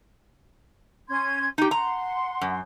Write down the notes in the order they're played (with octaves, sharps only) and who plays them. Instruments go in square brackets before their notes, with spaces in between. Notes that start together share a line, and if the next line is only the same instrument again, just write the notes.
[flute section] C#4 C6 G#6
[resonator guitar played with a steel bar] D#4 G4
[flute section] F#5 C6 [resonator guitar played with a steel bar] A#5
[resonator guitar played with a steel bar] F#2